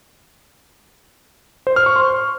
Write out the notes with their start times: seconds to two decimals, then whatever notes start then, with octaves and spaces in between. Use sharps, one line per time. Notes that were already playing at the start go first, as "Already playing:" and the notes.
1.67 C5
1.76 F6
1.86 C#6
1.96 C6